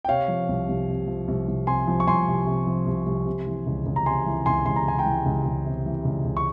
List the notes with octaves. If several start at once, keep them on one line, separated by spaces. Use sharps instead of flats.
G5
C3 C#5 F5
F3
C2
C2
C3
F3
C2
C2
C3 G#5 C6
F3
C#6
C2 G#5 C6
C2
C3
F3
C2
C2
C3
E3
C#2
C#2
A#5
C3 G#5 C6
E3
C#2 G#5 C6
C#2 C6
A#5
C3 G#5
G5 A#5
E3
C#2
C#2
C3
E3
C#2
C#2
C#6